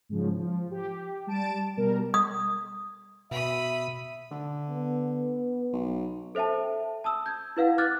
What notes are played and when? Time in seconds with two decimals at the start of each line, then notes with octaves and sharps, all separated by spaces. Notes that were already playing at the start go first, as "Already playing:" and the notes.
0.09 G#2 C#3 F3
0.39 F3
0.71 G4
1.27 G3 A5 D7 E7
1.77 B2 G3 A#4
2.14 D#6
3.31 B2 E5 B5 D#6
4.31 D3
4.69 B3
5.73 B1
6.35 A4 C5 E5 G5 A5
7.04 A5 D#6 E6
7.26 G6 G#6
7.57 E4 B4 F5 F#5
7.78 D6 F6 F#6 G#6 A6